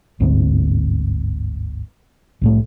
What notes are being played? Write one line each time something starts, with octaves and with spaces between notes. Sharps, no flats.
G1 D2 G#2 C4
C2 A2 A3